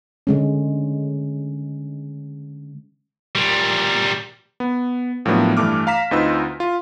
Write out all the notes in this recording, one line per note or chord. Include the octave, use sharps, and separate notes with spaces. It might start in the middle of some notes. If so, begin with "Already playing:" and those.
D3 G#3 C#4
A#2 G3
B3
A2 F3 F#3 A#3 B3 D4
G2 E3 A3 D6 F6
F5 A#5 B6 E7
D2 C4 D#4 F4 B4 E6
F4